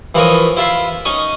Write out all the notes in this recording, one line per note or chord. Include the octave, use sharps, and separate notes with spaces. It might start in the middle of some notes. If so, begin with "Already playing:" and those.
E3 F3 A#4 C#5 D#5
E4 F4 E5 C6
C#4 D#4 C#6 D#6